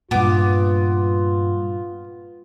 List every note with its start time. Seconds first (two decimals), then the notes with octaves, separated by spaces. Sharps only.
0.11 G2 A#2 B3 F4 D6